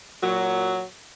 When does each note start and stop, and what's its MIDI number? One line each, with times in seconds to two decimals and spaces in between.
0.22 0.83 46
0.22 0.83 54